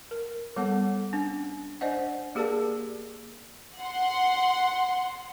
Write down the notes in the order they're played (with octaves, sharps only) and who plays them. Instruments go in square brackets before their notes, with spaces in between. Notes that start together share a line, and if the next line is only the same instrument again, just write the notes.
[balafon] A#4
G3 B3 A4 F#5 A5
C#4 D4
D4 C5 D5 D#5 F#5
A#3 G4 G#4 A#4 D5 A5
[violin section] F#5 C6